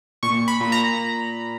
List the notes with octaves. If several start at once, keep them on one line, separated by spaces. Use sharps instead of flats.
A#2 C#6
B5
A#2
A#5